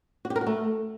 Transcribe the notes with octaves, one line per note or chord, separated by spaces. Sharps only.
F#4
G4
A#4
F#4
A3